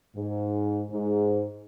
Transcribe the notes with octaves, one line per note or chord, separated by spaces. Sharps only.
G#2
G#2